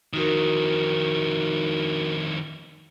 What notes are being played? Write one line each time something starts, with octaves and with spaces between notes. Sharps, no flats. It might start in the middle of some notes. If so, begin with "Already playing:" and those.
F2 D#3 D#4 F#4 A#4